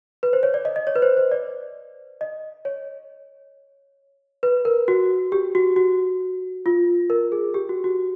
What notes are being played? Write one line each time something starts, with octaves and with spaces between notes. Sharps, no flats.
B4
C5
C#5
D5
D#5
D#5
C#5
B4
C5
C5
D5
D#5
C#5
B4
A#4
F#4
G4
F#4
F#4
F4
A#4
G#4
G4
F#4
F#4